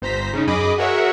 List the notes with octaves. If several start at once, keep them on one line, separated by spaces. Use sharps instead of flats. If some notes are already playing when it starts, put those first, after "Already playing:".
G1 C5 A#5 B6
C#3 C#4 D#4
F#2 G#4 D#5 B5 D6
F#4 G#4 A#4 C#5 E5 F#5